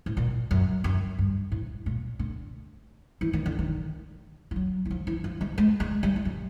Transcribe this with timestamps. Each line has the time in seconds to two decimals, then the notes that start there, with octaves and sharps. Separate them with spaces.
0.06 A2
0.17 A#2
0.51 F#2
0.84 F#2
1.18 G2
1.52 A2
1.86 A#2
2.19 D3
3.21 E3
3.33 D#3
3.46 D3
3.59 D#3
4.51 F3
4.56 F#3
4.85 E3
4.91 F3
5.07 E3
5.24 F3
5.41 G#3
5.58 G#3
5.80 G#3
6.03 G3
6.16 G3
6.25 F#3